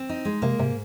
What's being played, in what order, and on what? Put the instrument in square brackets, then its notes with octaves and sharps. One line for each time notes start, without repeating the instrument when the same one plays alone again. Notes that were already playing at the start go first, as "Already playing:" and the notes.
Already playing: [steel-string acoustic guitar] C4
D#4
G#3
[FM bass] C3 [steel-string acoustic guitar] A#3
[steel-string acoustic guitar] G#2 [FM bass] C3